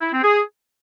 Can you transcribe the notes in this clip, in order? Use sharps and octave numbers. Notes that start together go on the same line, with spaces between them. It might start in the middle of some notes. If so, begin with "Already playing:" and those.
E4
C4
G#4